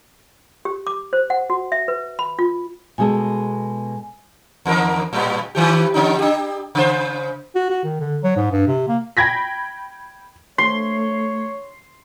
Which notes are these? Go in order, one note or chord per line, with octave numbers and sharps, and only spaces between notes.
G4
D6
C5
F#5
F#4
E5
B4
B5
F4
B2 G#3 A4 G#5
E2 D#3 A#4
A2 G3 B3
D#3 E3 G4
D3 C#4 D#4
D4 G4
C#3 C5
F#4
F#4
D#3
D3
F#3
G#2
G2
C3
A#3
G5 B5 G#6 A#6 B6
A3 C#5 C6